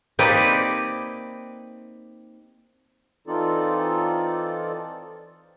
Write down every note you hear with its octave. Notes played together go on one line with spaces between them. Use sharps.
A#3 C4 D#4 G4 B4 D5
E3 C4 D#4 F4 A4 D5